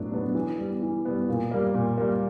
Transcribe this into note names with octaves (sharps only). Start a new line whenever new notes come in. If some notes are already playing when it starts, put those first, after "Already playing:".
Already playing: A2 F#3 B3 D4
F#3 B3 D4
E3
G3 B3
E3
G3 B3
A#2
G3 A#3
A#2
G3 A#3